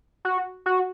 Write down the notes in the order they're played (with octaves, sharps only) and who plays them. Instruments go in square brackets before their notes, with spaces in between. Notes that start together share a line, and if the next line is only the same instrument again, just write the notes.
[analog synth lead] F#4
F#4